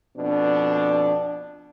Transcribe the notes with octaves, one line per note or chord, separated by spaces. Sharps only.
F2 B2 D4